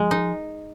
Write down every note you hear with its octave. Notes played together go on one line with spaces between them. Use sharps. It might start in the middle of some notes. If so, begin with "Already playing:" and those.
Already playing: F3 G#3
D#4